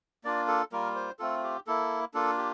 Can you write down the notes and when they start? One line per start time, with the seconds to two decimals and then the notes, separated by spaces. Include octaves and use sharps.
0.24 A#3 D4 F4 D5
0.48 A4
0.72 G3 A#3 F4 A#4
0.95 C5
1.19 A3 C4 F4 A4
1.43 G4
1.67 A#3 E4 A4
2.14 A#3 D4 F4 A4
2.38 G4